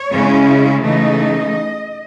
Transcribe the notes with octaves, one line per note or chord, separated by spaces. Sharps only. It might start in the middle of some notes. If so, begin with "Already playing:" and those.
Already playing: C#5
C#3 G#3 C#4 E4
C#3 E3 A3 D#4 D#5